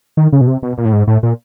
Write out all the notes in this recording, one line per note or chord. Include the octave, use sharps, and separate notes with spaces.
D#3
C#3
B2
C3
B2
A#2
A2
G#2
A2
A#2